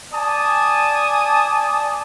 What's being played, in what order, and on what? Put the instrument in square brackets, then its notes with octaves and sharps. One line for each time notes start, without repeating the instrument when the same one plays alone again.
[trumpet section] D5 G#5 A5 D#6